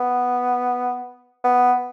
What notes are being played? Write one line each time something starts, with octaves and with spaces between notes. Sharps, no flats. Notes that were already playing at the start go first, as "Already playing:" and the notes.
Already playing: B3
B3